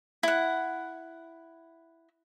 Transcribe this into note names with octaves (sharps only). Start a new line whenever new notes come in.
E4 F#5